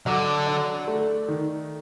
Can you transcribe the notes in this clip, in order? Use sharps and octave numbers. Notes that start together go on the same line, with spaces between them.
D3 F#3
D4
A3
D#3